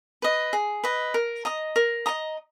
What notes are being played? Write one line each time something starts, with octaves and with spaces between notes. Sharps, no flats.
B4 D#5
G#4
B4 D#5
A#4
D#5 A#5 D#6
A#4
D#5 A#5 D#6